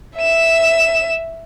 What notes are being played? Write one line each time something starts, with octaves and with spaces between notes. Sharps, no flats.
E5 E7